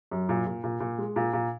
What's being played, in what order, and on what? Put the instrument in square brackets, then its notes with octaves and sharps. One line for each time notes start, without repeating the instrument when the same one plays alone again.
[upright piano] F#2
A#2
A#2
A#2
A#2
G#3
A#2
A#2